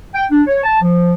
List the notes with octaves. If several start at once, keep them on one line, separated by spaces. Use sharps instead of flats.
G5
D4
C#5
A5
F3